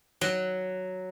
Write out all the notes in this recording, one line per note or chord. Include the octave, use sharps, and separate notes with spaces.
F#3